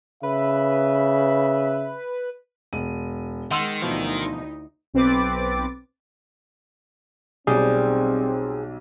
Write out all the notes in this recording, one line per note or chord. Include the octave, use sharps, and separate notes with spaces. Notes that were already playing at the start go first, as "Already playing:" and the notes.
C#3 B4 E5
E1 D#7
D#3 G#3 F#5 C6 E6
D2 B2 E3 F3 D#4 E4
B1 C4 B4 D6 A6
B1 G3 C4 G#4